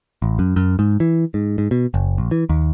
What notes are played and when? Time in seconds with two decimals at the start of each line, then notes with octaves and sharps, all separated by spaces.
0.22 A1
0.39 F#2
0.56 F#2
0.79 G#2
1.00 E3
1.34 G#2
1.58 G#2
1.71 B2
1.94 F#1
2.18 A#1
2.31 E3
2.49 D#2